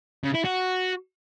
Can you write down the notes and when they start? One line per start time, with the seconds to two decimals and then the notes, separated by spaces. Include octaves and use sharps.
0.24 C#3
0.34 E4
0.44 F#4